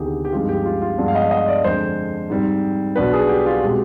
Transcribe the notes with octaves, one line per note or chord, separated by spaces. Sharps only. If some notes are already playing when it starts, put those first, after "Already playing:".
Already playing: D2 C3 D#3 B3 G4 G#4
G4
G2 F3 G#3 C4 D#4 F4
G4
F4
F4
G2 F3 G#3 B3 D4 F4
F5
D#5
D#5
D5
F2 D3 G#3 C5
G#2 G3 C4
B1 B2 B3 D4 B4
G#4
G4
F4
B2 G#3 C4 G4